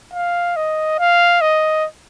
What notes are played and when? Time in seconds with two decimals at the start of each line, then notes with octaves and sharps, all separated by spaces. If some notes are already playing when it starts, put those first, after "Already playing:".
0.13 F5
0.56 D#5
0.99 F5
1.41 D#5